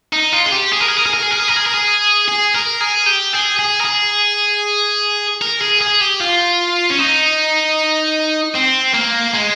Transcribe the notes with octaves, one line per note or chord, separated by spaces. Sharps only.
D#4
F4
G#4
G4
G#4
A#4
G#4
A#4
G#4
A#4
G#4
A#4
G#4
A#4
G#4
A#4
G#4
G#4
A#4
G#4
G4
G#4
G#4
A#4
G#4
A#4
G#4
G#4
G4
F4
C#4
D#4
C4
A#3
G#3